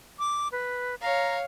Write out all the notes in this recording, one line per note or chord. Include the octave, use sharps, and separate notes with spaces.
D6
B4
C#5 F5 A#5